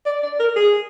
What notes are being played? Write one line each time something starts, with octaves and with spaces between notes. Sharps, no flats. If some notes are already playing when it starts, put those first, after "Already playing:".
D5
D5
A#4
G#4